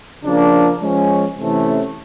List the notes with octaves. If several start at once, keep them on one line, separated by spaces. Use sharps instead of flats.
C#3 F3 A#3 D4
F3 G#3 C#4
C3 E3 A3 C#4